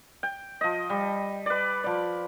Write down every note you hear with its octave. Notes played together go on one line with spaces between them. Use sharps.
G5
F3 D#5
G3
B4 D5
F3 D5